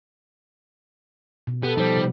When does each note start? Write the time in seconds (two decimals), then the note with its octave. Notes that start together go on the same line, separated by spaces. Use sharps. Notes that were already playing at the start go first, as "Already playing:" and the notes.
1.47 B2
1.63 B3 G4 A4
1.77 F3 G3 B3 D#4 C5
1.97 C3